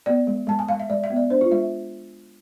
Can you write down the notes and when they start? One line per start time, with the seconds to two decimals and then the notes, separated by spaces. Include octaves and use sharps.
0.06 B3 D5
0.27 G#3
0.47 G#3 A5
0.59 G#5
0.68 G#3 F5
0.80 E5
0.90 G#3 D5
1.04 E5
1.10 B3
1.16 D5
1.30 D4 C5
1.41 F4
1.51 G#3 E5